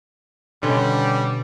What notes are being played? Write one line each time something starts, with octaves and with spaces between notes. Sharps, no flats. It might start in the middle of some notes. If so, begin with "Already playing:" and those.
B2 D3 G3 C#4 C#5 C6